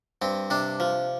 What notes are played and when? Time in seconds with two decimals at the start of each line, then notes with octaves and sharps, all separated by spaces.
0.22 G2 C4
0.50 C3 D4
0.80 F3